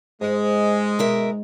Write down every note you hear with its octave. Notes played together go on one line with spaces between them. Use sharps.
G#2 G#3
B2 A#4 E5